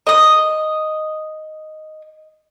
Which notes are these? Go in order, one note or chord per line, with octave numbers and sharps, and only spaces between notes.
D#5 D#6